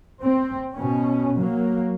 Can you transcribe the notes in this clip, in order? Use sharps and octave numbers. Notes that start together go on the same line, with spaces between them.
C4
B2 C#4
F#3 A#3